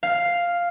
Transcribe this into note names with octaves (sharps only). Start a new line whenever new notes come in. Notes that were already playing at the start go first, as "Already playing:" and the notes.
F5